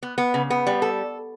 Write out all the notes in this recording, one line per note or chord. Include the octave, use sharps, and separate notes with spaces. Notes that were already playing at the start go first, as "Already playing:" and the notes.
B3
B3
C#3
B3
G3
A4